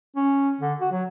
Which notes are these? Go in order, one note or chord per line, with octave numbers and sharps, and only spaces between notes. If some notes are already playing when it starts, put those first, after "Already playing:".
C#4
D3
F#4
F#3